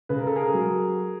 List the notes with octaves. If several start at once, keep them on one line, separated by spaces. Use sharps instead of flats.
C#3 B4
A#4
A4
G#4 A#4
F#3